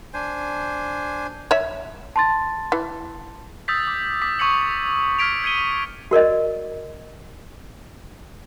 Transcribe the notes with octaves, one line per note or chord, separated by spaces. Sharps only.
D4 C5 G#5
C#5 E5
A5 C6 A6
E3
D#6 E6 G6 A6 B6
D6
D6 B6
C#6 D#6 G#6 B6 C#7 F#7
F6 G#6 B6 D7 F7
G#6 C#7 D#7 G7
F#4 A#4 D5 D#5